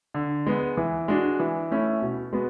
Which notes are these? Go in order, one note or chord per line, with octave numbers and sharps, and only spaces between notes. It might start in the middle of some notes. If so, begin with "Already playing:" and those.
D3
G#3 B3
E3
G#3 D4 F#4
E3
A3 C#4 E4
B2
G#3 B3 F#4